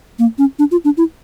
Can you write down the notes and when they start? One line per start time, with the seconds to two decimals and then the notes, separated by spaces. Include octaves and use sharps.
0.19 A#3
0.38 C#4
0.59 D4
0.71 F4
0.84 D4
0.97 E4